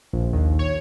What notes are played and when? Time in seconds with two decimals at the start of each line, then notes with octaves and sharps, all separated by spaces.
0.13 A#1
0.33 D#2
0.59 C#5